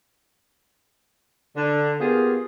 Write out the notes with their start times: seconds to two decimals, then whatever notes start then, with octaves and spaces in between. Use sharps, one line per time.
1.56 D3
2.00 A#3 B3 F4 G4 G#4